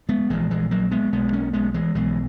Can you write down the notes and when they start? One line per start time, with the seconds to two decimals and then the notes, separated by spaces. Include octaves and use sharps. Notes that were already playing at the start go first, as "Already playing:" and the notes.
0.09 G#3 B3
0.30 A#1 A#2 E3 G#3
0.51 E3 G#3
0.71 F#3 A#3
0.91 G#3 B3
1.12 B1 B2 G#3 B3
1.33 A#3 C#4
1.53 G#3 B3
1.74 E3 G#3
1.94 B1 B2 E3 G#3